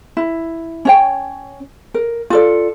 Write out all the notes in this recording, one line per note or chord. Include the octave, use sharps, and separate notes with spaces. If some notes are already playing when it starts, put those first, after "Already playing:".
E4
C#4 C#5 G5
A#4
F4 A4 D5